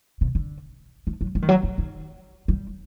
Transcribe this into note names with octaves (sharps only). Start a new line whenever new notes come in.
C3
D3
D#3
F#3
G3
D#3
F#3
F#3
D#3
G3